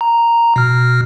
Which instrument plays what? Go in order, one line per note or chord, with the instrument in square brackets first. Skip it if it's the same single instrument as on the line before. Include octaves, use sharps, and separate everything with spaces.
[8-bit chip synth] A#5
B2 F6